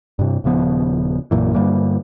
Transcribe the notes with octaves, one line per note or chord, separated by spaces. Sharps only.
G2 C3
D#1 C#3 F3 B3
A#1 F#2 A#2 E3
G2 D3 G3 A#3